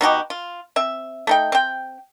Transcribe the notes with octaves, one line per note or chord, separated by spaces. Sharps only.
B2 D#4 F#4 G4
F4
C4 E5
A3 D#4 G5
C4 G5